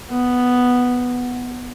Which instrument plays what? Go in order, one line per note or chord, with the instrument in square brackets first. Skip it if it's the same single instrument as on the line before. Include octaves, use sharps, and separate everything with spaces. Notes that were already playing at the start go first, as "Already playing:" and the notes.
[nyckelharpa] B3